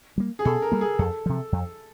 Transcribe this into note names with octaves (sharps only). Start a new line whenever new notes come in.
G3 A#3
G#4
B2 A4
A#4
G3 A#3
G#4
F2 A4
C3 F3
F2